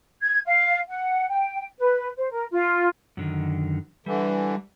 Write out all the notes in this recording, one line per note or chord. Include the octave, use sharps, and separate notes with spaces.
G#6
F5
F#5
G5
B4
C5
A#4
F4
F#2 D3 D#3
D3 E3 G3